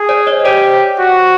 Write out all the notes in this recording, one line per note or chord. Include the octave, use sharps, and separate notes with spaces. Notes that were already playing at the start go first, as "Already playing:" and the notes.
Already playing: G#4
C5 D5
C#5 D#5
C#5
G4 C5 D5
F#4